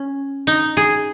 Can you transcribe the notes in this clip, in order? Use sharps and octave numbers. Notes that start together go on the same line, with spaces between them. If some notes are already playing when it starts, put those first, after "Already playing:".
Already playing: C#4
D#4
G#4